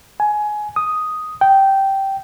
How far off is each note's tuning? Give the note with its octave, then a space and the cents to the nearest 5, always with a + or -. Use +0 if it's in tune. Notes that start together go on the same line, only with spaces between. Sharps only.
G#5 +15
D#6 +0
G5 -10